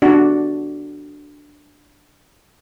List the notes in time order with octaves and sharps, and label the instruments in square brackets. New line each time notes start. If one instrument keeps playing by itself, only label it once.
[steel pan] D4 F#4